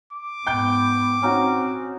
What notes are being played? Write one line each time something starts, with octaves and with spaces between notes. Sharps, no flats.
D6
G#2 B3 G5 G6 D7
C4 C#4 D#4 F#4